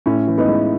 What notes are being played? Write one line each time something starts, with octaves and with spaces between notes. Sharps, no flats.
A2 C#4
E3
B3 D#4
G#3